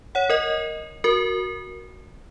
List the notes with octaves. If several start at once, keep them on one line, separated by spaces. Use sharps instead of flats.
C#5 F#5
A#4 D#5
F#4 A#4